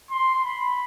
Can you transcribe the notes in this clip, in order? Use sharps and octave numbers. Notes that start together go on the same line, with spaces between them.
C6
B5